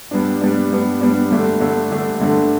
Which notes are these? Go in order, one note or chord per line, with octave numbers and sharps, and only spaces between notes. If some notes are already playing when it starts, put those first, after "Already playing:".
G2 G3 B3 D4
G2 G3 B3 D4
G2 G3 B3 D4
G2 G3 B3 D4
G2 D3 A3 D4
G2 D3 A3 D4
G2 D3 A3 D4
G2 D3 A3 D4